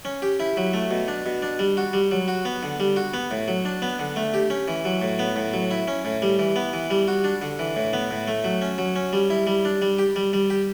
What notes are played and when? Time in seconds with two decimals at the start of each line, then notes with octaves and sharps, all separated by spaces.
0.05 C#4
0.22 G4
0.40 E4
0.57 F#3
0.73 A3
0.91 B2
1.08 D4
1.26 B2
1.42 D4
1.59 G3
1.77 F#4
1.93 G3
2.11 F#3
2.28 F#4
2.45 B3
2.63 D3
2.80 G3
2.96 F#4
3.14 B3
3.31 A2
3.48 F#3
3.65 D4
3.82 B3
3.99 D3
4.16 A3
4.34 G4
4.50 C#4
4.68 E3
4.85 F#3
5.02 A2
5.19 B3
5.36 A2
5.53 F#3
5.71 E4
5.88 C#4
6.05 A2
6.22 G3
6.39 E3
6.56 B3
6.73 E3
6.90 G3
7.08 F#4
7.24 D4
7.42 D3
7.59 E3
7.76 A2
7.93 B3
8.10 A2
8.28 A3
8.44 F#3
8.62 C#4
8.78 F#3
8.96 C#4
9.13 G3
9.30 E4
9.47 G3
9.65 D4
9.82 G3
9.99 G4
10.16 G3
10.33 G3
10.50 G4